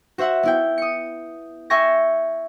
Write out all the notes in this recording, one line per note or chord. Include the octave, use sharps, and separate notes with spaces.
F#4 C5 E5 F#5
B3 E4 G5
D#6 C#7
E5 G5 G#5 C#6 A#6